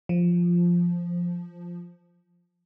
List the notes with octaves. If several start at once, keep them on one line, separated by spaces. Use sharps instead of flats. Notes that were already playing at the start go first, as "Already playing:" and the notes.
F3